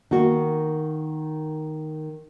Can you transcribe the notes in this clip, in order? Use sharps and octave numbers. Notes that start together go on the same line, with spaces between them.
D#3 A#3 F#4